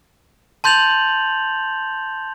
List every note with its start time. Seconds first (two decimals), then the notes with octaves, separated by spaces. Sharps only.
0.64 A5 C6 G6 A6 F7 F#7